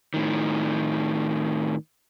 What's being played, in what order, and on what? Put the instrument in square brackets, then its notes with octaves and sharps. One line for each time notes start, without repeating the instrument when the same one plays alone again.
[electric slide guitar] A2 D#3